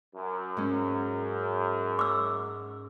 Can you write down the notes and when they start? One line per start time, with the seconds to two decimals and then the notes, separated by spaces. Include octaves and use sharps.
0.16 F#2
0.57 G#2 C#4
1.99 D6 E6